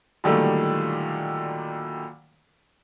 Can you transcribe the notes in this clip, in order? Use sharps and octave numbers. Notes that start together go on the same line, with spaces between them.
A#2 D3 D#3 F#3 G3 A3